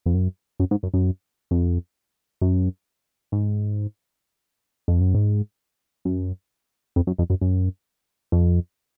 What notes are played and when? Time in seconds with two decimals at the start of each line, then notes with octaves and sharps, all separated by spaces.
0.06 F2
0.14 F#2
0.60 F#2
0.71 G#2
0.83 F#2
0.94 F#2
1.51 F2
2.41 F#2
3.32 G#2
4.88 F2
5.01 F#2
5.14 G#2
6.05 F#2
6.96 F2
7.07 F#2
7.18 F2
7.30 F#2
7.41 F#2
8.32 F2